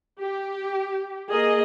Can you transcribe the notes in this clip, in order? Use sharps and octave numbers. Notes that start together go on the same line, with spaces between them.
G4
A#3 G#4 D#5